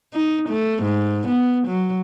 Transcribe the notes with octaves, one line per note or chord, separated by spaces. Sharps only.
D#4
A3
G#2
B3
F#3